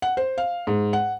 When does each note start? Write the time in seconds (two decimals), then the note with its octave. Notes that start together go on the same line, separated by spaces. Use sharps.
0.02 F#5
0.17 C5
0.38 F5
0.67 G#2
0.93 F#5